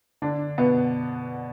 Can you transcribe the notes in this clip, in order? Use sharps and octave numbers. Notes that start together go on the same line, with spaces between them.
D3 D4
B2 B3